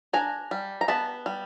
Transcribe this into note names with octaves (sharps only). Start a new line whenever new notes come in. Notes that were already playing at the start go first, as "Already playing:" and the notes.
D4 G#5 A#5
G3
A#5
B3 A5 B5
G3